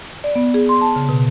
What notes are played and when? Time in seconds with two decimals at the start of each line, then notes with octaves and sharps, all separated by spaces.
0.24 D5
0.36 B3
0.54 G#4
0.69 C6
0.81 A5
0.96 C#3
1.09 B2